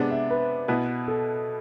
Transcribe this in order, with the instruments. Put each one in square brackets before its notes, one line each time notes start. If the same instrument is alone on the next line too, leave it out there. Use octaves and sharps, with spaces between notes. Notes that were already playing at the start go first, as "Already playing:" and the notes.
Already playing: [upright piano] C3 G#3 B3 D4
[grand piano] E5
B4
[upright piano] B2 B3 E4 B4
[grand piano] A4